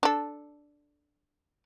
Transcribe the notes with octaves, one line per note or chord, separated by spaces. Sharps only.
D4 A4